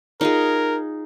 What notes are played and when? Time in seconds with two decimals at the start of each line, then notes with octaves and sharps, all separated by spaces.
0.21 D#4 F4 G#4 A#4